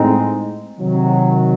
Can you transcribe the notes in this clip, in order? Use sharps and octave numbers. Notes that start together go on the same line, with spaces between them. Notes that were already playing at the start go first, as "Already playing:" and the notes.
Already playing: A2 G#3 C4 D#4
C3 D#3 F#3